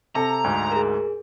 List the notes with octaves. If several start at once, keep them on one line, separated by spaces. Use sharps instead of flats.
C3 A4 A#5
D2 G#2
G#4 A#4